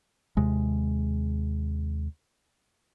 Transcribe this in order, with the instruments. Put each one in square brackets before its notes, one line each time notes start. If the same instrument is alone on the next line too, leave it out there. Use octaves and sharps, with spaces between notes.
[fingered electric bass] D#2 C3 G#3